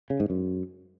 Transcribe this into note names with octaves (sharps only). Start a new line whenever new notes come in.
C#3
G#2
F#2